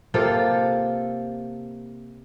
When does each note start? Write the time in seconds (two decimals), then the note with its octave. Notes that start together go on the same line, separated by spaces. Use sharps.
0.14 C3 A#3 F4 A4